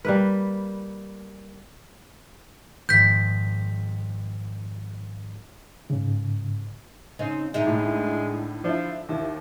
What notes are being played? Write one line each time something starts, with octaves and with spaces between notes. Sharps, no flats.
G3 A#3 B4
G#1 F2 G6 B6
G#2 C#3
C#3 C4 D#4
D3 G#3 D#4 E5
A2
F3 D4 E4
D#2 E4